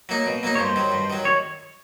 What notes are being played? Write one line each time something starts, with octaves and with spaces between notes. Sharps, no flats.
F#3 A#3 D#4
B2
F#3 A#3 D#4
C#5
G2 C5
D#3 F#3
G2
D#3 F#3
C#5